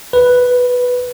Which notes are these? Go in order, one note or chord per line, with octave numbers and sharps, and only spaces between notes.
B4